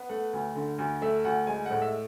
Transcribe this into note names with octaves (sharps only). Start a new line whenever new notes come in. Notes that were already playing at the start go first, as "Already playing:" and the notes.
Already playing: B3
A3 F#5
D2
D3
D2
A3 E5
D2 F#5
G#3 G#5
F#5
A2
E5